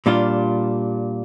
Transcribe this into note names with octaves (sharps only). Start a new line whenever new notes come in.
A#2 G3 D4 F4